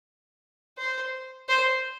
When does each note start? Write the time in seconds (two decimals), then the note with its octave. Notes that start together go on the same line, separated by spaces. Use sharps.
0.78 C5
1.49 C5